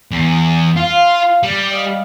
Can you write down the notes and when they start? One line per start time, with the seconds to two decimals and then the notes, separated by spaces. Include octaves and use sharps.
0.11 E2
0.77 F4 F5
1.43 G3 D4
1.71 D5 D#5 F5